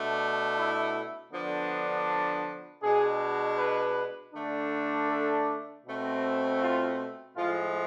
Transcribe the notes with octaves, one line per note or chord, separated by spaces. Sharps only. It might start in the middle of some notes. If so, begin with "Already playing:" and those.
Already playing: B2 A3 D4
E4
D3 F3 B3 D4
B2 G#3 D4 G#4
B4
D3 A3 D4
A4
B2 A3 C4
F4
A2 F3 G#3 F4